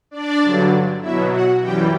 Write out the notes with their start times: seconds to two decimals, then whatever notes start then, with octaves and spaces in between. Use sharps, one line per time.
0.11 D4 D5
0.41 G2 D3 F#3
1.01 B2 F#3 E4 E5
1.32 F#4 F#5
1.62 F#2 E3 G3 G4 G5